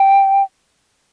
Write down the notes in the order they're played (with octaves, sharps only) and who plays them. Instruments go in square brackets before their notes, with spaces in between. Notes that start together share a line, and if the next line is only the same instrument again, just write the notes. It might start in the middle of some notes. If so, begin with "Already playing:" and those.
Already playing: [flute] G5